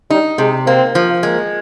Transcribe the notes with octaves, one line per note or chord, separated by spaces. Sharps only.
G3 D#4
C3 G#3
A#3 C4
F3
G#3 A#3